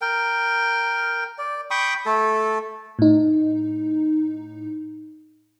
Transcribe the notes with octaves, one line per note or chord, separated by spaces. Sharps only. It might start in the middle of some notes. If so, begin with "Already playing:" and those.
A#4 G5
D5
G5 B5 C#6 D#6
A3 A4
A2 D#4